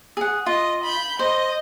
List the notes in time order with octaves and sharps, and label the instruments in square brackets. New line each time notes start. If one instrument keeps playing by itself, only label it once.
[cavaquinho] G#4 F#5
[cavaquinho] F4 [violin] D#5
[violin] B5 G6
[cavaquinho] C5 [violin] D#5